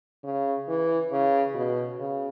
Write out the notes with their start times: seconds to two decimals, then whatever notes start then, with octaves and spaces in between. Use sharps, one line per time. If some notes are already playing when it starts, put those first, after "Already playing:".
0.24 C#3
0.68 E3
1.12 C#3
1.55 B2
1.99 C#3